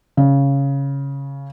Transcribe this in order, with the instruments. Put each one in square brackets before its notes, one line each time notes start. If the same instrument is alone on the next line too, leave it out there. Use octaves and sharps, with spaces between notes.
[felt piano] C#3